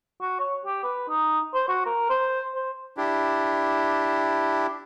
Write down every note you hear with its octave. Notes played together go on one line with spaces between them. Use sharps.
F#4
C#5
G4
B4
D#4
C5
F#4
A#4
C5
C5
D4 E4 G4